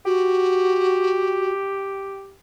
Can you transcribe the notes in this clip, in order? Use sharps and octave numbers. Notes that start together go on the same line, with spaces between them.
F#4 G4